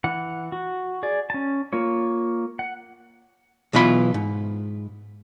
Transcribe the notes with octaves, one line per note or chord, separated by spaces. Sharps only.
E3 F#5
F#4
G#4 D5
C#4 A5
A#3 F4 C#5
F#5
B1 B2 E3 F4 B5
G#2